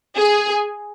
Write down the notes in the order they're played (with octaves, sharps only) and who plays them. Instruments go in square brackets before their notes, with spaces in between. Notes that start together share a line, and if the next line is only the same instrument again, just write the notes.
[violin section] G#4